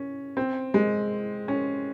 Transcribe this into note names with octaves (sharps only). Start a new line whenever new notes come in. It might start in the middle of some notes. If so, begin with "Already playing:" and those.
Already playing: C#4
C4
G#3
C#4